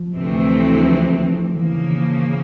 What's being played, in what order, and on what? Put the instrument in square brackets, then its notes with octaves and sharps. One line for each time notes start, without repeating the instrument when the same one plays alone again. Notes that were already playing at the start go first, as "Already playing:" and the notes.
Already playing: [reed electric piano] F3
[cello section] D2 C3 E3 A3 C4
[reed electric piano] F#3
F3
D#3
[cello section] C#3 F3 A#3 [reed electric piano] E3
[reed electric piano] D#3